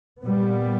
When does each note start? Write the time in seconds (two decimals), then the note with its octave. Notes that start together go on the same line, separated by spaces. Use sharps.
0.23 A#2 G3 B3